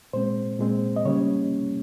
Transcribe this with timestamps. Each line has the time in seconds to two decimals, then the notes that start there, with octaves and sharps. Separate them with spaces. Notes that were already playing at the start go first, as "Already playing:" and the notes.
0.13 A#2 G#3 C4 C5
0.59 A#2 G#3 C4
0.96 D#5
1.05 C#3 G3 A#3 C#4 C#5